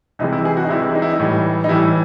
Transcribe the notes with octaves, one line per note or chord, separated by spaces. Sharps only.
C2 C3 E3 G#3 D#4
E4
G#4
F#4
D#4
C2 C3 E3 G#3 E4
D#4
E4
D#4
A2 E3 G3
D#4
A2 E3 G3 E4